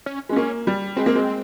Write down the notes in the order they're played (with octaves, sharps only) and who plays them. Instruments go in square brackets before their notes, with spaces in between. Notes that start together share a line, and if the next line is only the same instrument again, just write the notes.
[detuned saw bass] C#4
[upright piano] G#3
[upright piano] A#3 [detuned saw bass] C#4
[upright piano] G3
[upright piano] G#3 [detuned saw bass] C4
[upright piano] A#3
G#3